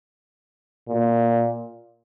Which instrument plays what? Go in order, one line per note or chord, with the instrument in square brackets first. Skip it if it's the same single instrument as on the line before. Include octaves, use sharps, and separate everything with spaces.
[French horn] A#2